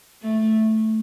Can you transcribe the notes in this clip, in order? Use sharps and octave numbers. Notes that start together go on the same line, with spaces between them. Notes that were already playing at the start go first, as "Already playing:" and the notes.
A3